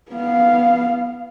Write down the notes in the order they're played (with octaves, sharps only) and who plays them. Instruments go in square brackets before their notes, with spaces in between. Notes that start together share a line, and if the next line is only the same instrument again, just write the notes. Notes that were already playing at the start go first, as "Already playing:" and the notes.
[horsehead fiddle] B3 F5